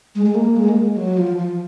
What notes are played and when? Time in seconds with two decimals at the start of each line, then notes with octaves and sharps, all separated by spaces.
0.15 G#3
0.26 G#3
0.35 A#3
0.57 G#3
0.69 A#3
0.77 G#3
0.97 F#3
1.17 F3
1.37 F3